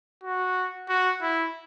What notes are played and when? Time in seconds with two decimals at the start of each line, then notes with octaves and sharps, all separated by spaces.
0.23 F#4
0.89 F#4
1.22 E4